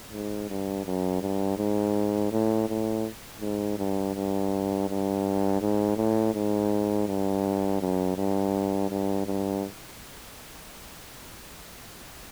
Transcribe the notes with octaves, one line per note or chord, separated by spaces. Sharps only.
G#2
G2
F#2
G2
G#2
A2
A2
G#2
G2
G2
G2
G#2
A2
G#2
G2
F#2
G2
G2
G2